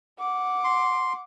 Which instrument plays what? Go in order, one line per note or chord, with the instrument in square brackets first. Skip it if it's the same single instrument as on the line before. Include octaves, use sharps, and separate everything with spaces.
[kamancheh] F#5 D6
[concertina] C6